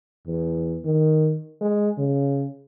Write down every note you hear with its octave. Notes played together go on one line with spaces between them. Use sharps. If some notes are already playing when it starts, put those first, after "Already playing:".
E2
D#3
G#3
C#3